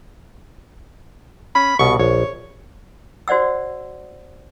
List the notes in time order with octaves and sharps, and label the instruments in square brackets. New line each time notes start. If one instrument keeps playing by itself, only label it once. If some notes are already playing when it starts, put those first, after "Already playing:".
[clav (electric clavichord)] C#4 [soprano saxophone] B5
[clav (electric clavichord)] C2 B2 [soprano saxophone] C#6
[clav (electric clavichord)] A#1 [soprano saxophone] C#5
[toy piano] F#4 C5 D5 F#5 E6